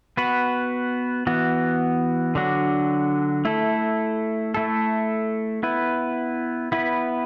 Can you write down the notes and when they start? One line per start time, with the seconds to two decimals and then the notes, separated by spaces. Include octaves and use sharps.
0.17 B3 F#4 B4
1.27 E3 B3 F#4
2.35 D3 F#3 D4 F#4
3.45 A3 E4 A4
4.54 A3 E4 A4
5.63 B3 E4 B4
6.72 B3 E4 B4